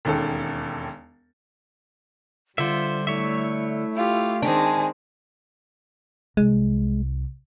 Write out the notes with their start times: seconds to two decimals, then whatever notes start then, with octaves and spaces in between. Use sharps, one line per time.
0.05 E1 D#2 C#4 A4
2.58 D3 G3 F4 C5 E5
3.07 A3 E4 C#5 E5
3.95 F4 G4
4.42 D#3 G#3 C4 D4 G#5
6.37 C2 G#3